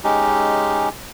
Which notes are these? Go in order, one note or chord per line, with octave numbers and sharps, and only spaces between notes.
G#3 C#4 D#4 G4